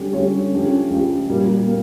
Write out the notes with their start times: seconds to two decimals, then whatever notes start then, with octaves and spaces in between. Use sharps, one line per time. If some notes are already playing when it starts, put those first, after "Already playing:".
Already playing: D3 G3 C#4 G4
0.13 D3 G3 C#4 G4 C#5
0.51 C#2 C#3 F3 C#4 G4
0.90 C#2 C#3 F3 C#4 G4
1.28 A#2 G3 A#3
1.67 A#3